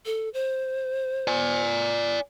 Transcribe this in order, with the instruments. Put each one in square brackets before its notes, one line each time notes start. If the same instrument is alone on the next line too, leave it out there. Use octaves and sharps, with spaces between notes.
[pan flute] A4
C5
[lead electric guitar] D5 G#5